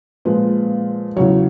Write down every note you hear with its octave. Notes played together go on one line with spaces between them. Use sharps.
A#2 F3 G#3 B4
E2 C#3 F#3 C#5